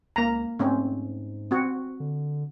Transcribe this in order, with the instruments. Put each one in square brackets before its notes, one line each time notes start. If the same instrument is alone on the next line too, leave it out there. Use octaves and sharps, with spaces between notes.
[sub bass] C#2 [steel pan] A#3 A#5
[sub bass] G#2 [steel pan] A3 C4 C#4
[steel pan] C4 F#4
[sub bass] D3